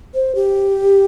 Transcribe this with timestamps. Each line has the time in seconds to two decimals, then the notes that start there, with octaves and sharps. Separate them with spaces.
0.14 C5
0.35 G4